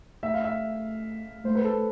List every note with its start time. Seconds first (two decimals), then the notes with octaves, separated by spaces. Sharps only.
0.23 A3 E5
0.34 F5
0.44 E5
1.45 A3 C5
1.55 B4
1.64 A4